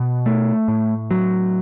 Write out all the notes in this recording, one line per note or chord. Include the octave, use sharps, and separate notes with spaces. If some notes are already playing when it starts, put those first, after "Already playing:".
Already playing: B2
A3
A2
F#3